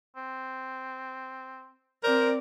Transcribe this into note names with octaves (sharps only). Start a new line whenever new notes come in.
C4
C4 A#4 C5 D5